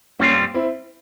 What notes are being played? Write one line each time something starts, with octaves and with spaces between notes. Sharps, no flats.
G2 G3 A#3 C4 C#4 F4
C4 E4